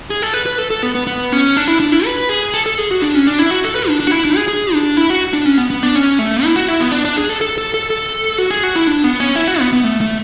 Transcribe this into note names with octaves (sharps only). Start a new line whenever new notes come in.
G#4
A4
B4
B4
A4
A4
B3
B3
B3
C#4
D4
E4
D4
E4
B4
G#4
A4
A4
G#4
F#4
D4
C#4
D4
E4
F#4
A4
B4
D4
D4
F#4
E4
D4
G#4
G#4
D4
E4
F#4
D4
C#4
B3
B3
D4
C#4
A3
E4
F#4
E4
B3
D4
D4
G#4
A4
A4
A4
A4
A4
F#4
G#4
F#4
E4
D4
B3
C#4
E4
F#4
B3
B3
A3
A3